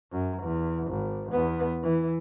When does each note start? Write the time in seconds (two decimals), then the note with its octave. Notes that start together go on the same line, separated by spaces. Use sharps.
0.12 F#2
0.43 E2
0.87 G#1
1.32 E2 B3
1.83 E3